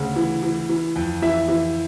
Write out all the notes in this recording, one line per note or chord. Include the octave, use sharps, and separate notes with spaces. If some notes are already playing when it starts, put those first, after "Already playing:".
Already playing: D2 C#3
E3
E3
E3
F2
E3 E5
E3